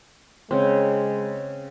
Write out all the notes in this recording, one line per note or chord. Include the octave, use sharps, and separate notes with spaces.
C#3 G#3 C4